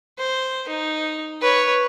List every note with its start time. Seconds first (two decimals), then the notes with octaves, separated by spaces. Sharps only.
0.18 C5
0.68 D#4
1.41 B4 C#5